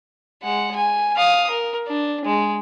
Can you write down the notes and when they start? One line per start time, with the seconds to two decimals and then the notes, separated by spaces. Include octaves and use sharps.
0.42 G#3 F#5
0.76 G#5
1.16 F5 D#6
1.50 A#4
1.87 D4
2.25 G#3